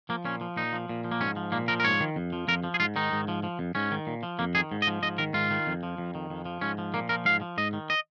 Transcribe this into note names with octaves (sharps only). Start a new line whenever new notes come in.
F3 A#3
A#2 C#4
F3
A#2 D#4
F3
A#2
F3
A#3
G#2 C#4
F3
A#2 A#3
F3 A#4
A#4
G#2 C#5
D#3
F2
F3
F2 A#4
F3
G#4
G#2 F4
D#3 D#4
G#2
F3
F3
F2
G#2 C#4
D#3
A#2
F3
F2 A#3
D#3 G#4
G#2
D#5
F3
G#2 D#5
D#3 A#4
G#2 F4
D#3
F2
F3
F2
D#3
F2
F3
G#2 C#4
F3
A#2 A#3
F3 A#4
G#2 F5
F3
G#2 D#5
D#3
D#5